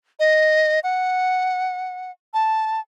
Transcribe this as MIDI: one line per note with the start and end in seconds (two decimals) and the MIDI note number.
0.20 0.80 75
0.84 2.11 78
2.34 2.80 81